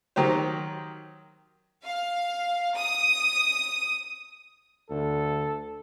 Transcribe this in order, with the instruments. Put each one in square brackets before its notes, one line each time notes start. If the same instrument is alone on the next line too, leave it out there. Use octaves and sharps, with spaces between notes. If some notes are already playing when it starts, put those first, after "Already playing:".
[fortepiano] D#3 F#3 G4 C5
[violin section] F5
D#6
[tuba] D2 [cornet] A4